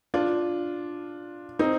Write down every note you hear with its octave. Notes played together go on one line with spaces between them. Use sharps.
D4 F4
C4 D#4